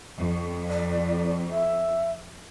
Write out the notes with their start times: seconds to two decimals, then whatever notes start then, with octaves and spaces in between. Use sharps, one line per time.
0.18 F2
0.69 D5
1.50 E5